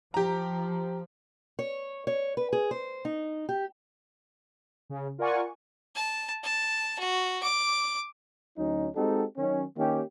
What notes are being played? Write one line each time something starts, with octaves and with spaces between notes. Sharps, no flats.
F3 G4 A#5
C#5
C#5
B4
G#4
C5
D#4
G4
C#3
F4 A#4 D5 F#5 G#5 C#6
A5
A5
F#4
D6
D2 F#3 C#4 D#4
G#3 C4 D#4 F#4 G4 A4
D#3 F#3 C#4
D#3 A#3 C#4 D#4 G4